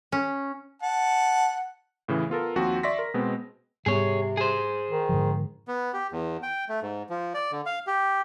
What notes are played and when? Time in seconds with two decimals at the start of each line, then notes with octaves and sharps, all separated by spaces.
0.12 C#4
0.82 F#5 A5
2.08 A2 C#3 E3
2.30 B3 F4 A4 A#4
2.56 D#2 F3 C4 F#4
2.83 D5 E5 C6 C#6 A#6 B6
2.99 A#4
3.14 B2 G#3 B3 C4
3.86 G#2 C3 G3 B3 G#4 C#5
4.37 G#4 C5
4.91 D#3
5.09 G#2 D3 F3
5.68 B3
5.94 G4
6.12 E2
6.43 G5
6.69 A3
6.82 G#2
7.10 F3
7.34 D5
7.51 D3
7.66 F5
7.87 G4